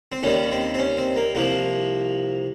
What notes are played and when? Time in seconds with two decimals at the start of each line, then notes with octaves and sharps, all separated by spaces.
0.12 C4
0.23 D#2 D#3 G3 C#4
0.52 C4
0.74 C4
0.79 C#4
0.97 C4
1.16 A#3
1.35 C2 C3 F3 A#3